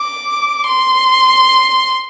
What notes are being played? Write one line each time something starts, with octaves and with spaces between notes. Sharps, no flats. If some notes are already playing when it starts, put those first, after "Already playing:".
Already playing: D6
C6